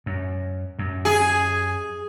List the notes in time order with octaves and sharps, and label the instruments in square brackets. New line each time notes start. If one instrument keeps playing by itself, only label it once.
[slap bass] F#2
F#2
[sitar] G#4